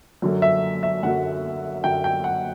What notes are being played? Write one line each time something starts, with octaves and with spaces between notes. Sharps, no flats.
F#2 D3 F#3
E5
E5
F#2 D3 F#3 F#5
F#2 D3 F#3 G5
G5
F#5